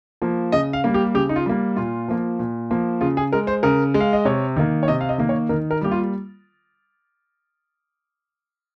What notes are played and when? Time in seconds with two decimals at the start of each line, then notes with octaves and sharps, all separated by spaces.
0.22 F3 A#3
0.52 C#3 D#5
0.73 F5
0.84 G3 A#3
0.94 G4
1.14 C#3 G4
1.29 D#4
1.36 F4
1.46 G3 A#3
1.76 A#2 F4
2.08 F3 A#3
2.39 A#2
2.71 F3 A#3
3.01 C#3 F4
3.17 G#4
3.33 G#3 A#4
3.47 C5
3.63 C#3 A#4
3.94 G#3
4.01 F5
4.13 D#5
4.25 C3 C#5
4.56 D#3 A#3
4.83 C#5
4.88 C3 D#5
5.01 F5
5.09 D#5
5.18 D#3 A#3
5.29 C#5
5.49 D#3 A#4
5.71 A#4
5.81 G3 A#3 G4
5.91 F4